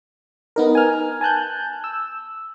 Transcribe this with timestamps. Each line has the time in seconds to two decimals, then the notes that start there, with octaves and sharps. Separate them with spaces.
0.56 B3 D#4 A#4
0.75 G#5 F6
1.21 G#5 A5 F#6 G6
1.84 E6